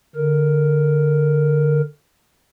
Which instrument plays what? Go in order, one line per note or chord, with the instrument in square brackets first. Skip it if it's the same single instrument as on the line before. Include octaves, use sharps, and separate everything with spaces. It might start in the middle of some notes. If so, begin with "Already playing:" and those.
[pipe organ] D3 A#4